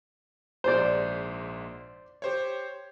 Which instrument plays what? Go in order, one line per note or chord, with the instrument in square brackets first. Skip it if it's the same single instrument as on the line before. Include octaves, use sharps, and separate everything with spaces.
[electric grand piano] A#1 G#2 [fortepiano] C5 D5
[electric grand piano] G4 C5 C#5